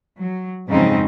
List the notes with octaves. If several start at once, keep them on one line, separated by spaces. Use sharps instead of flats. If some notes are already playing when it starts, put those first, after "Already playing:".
F#3
F2 G#2 C#3 F#3 C4 D#4